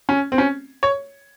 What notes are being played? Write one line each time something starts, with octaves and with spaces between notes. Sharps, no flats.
C#4
C4
C#4
C#5